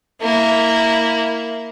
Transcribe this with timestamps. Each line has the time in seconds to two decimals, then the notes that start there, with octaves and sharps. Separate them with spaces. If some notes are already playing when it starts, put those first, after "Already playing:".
0.22 A#3 E4